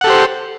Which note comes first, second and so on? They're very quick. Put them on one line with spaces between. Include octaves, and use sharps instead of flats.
F#5 A4 G4 C5